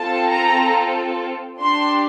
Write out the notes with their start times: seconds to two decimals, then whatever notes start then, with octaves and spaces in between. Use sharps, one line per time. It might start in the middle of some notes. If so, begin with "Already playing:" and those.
Already playing: C4 F4 A4 A5
0.29 A#5
1.60 D4 G4 C6